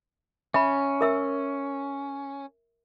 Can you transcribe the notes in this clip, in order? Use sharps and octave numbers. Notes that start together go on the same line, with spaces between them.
C#4 E5 B5
A#4 E5 E6